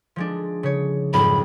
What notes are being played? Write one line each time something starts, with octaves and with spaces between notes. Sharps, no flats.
F3 G#3 D4
C#3 C#5
B1 F2 G#2 B5